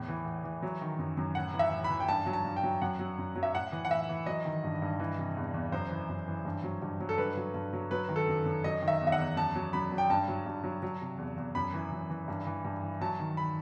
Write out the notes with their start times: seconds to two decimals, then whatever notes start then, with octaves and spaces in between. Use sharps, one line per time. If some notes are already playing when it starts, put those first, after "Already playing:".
Already playing: E2 A2
0.08 E3
0.26 A2
0.44 E3
0.62 F#3
0.81 D#3
0.99 F#2
1.17 F#2
1.35 A2 F#5
1.54 E3
1.59 E5
1.72 A2
1.84 B5
1.90 E3
2.00 G5
2.08 G2 A5
2.26 F#3
2.33 A5
2.45 G2
2.56 G5
2.63 F#3
2.82 F#2 F#5
2.99 F#3
3.18 F#2
3.36 F#3
3.43 E5
3.54 A2 F#5
3.72 E3
3.85 F#5
3.91 A2 E5
4.09 E3
4.26 F#3 D#5
4.45 D#3
4.64 G2
4.82 G2
5.00 E3
5.18 C3
5.37 E2
5.54 E2
5.72 F#2 C5
5.91 E3
6.09 F#2
6.28 E3
6.45 G2
6.63 F#3
6.82 G2
7.00 F#3
7.09 A4
7.18 G2 B4
7.37 F#3
7.54 G2
7.73 F#3
7.91 F#3 B4
8.09 D#3
8.16 A4
8.28 F#2
8.45 F#2
8.64 F#3 D#5
8.82 D#3
8.88 E5
9.01 E2
9.07 E5
9.12 F#5
9.18 E2
9.36 F#2 A5
9.55 F#3
9.73 F#2 B5
9.92 F#3
9.98 G5
10.10 G2 A5
10.28 F#3
10.46 G2
10.64 F#3
10.82 F#3
11.01 C3
11.18 E2
11.37 E2
11.55 F#2 B5
11.74 E3
11.92 F#2
12.10 E3
12.28 G2
12.47 E3
12.65 G2
12.82 E3
13.01 F#3 A5
13.19 D#3
13.37 B5